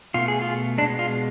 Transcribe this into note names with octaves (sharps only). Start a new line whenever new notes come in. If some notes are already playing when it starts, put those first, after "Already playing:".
B2 A3 F4
G#4
F4
B2 G#3 D4
F4